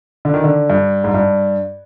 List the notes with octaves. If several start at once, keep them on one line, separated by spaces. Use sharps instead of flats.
D3
D#3
D3
G2
G#2
G2